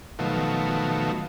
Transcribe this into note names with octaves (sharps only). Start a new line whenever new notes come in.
B2 D#3 F3 F#3 A3